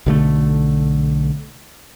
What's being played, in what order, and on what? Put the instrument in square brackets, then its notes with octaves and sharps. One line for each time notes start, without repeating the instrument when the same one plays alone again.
[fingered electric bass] B1 D3 A3